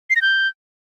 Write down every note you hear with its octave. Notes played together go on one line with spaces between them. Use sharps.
C7
A#6
G6